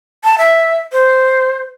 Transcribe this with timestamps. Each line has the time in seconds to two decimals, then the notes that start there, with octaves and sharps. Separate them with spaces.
0.24 A5
0.38 E5
0.92 C5